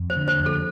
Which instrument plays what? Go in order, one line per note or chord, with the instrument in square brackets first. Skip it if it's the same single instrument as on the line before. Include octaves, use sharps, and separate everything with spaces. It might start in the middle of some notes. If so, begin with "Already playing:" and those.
Already playing: [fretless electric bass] F2
[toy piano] C5
[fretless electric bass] D3
[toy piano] C5
[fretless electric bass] F2
[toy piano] A4